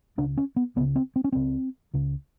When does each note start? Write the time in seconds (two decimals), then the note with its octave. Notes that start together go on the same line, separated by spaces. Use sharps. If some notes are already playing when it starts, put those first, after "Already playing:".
0.18 C#2 C#3 D4
0.37 C#4
0.56 B3
0.76 C#2 B3
0.81 C#3
0.96 C4
1.16 C4
1.24 C#4
1.32 C#2 C#3 C4
1.94 C#2 C#3